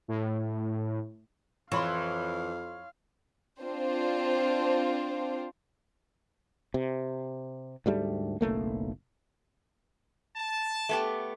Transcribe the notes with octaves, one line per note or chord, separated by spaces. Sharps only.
A2
F2 E3 C#5 F5 B5 C6
C4 D4 F4 C5
C3
D2 G#2 G3 A3
F#1 B1 A3 A#3
A5
A3 B3 G4